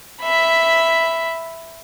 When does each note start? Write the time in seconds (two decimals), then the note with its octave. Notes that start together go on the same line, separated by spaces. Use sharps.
0.22 E5 B5